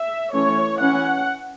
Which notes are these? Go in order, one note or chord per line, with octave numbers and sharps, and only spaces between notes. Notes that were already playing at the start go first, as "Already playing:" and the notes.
Already playing: E5
E3 A3 C#4 C#5
E3 C#4 F#5